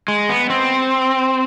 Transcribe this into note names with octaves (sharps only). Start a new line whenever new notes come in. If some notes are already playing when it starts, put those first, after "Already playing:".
G#3
B3
C4